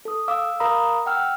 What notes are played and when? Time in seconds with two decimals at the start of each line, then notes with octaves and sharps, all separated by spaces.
0.05 A4 D#6
0.28 F5 D6 E6
0.60 A#4 F5 A#5 B5 D#6
1.06 F#5 G5 E6 F6